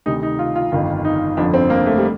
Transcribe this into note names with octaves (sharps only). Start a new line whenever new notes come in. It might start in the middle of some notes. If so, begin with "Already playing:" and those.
D2 C3 D#3 D#4
D#4
F4
F4
G1 F2 D#3 F4
D#4
G1 F2 D3 F3 D4
C4
A#3
A3
G3